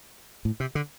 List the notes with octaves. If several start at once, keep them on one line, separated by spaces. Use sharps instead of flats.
A2
C3
D3